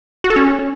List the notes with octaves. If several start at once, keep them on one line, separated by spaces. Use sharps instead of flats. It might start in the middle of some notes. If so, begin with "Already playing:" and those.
F#4
A4
C#4